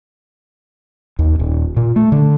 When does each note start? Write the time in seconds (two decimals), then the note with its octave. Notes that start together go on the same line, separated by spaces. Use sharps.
1.19 D#2
1.39 D#1
1.77 A#2
1.96 A3
2.12 D3